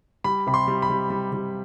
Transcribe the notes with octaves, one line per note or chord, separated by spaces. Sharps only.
G3 B5
C3 B5
C6
G3
B5
G3
G3
G3